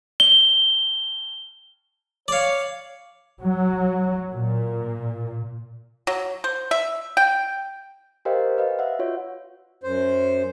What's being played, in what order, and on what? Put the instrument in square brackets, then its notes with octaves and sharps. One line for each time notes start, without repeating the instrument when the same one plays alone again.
[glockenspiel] G7
[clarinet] C#5 [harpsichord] D5 F5
[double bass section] F#3
A#2
[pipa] F#3
C5
E5
G5
[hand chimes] G4 A#4 C5 D#5 F5 G5
B4 D#5 F5
E5 F#5
F4 F#4 C#5
[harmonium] F#2 C5